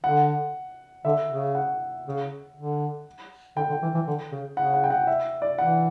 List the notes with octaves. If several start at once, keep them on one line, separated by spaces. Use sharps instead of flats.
D3 F#5
D3 E5
C#3
F#5
C#3
D3
D3 G5
D3
E3
E3
D3
C#3
C#3 F#5
F#5
G5
F#5
E5
D5
E3 F#5